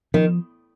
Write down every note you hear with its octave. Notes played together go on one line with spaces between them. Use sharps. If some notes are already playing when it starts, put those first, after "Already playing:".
D#3 F3